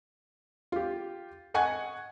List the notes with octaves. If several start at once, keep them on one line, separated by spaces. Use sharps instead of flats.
F4 G4
D#5 F#5 G#5 C#6 F#6 G#6